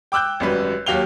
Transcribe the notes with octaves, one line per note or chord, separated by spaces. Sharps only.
G5 D6 E6 F#6 G6
G#1 F#2 G3 B4
D#2 F#3 G4 F5 F7 G7